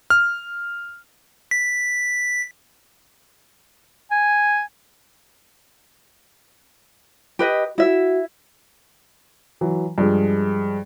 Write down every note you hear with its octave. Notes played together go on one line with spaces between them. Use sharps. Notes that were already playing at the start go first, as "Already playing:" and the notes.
F6
B6
G#5
G4 B4 D#5
E4 F#4 E5
E3 F#3
G2 F3 G#3